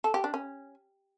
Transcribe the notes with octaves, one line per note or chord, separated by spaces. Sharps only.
A4
G4
D4
C#4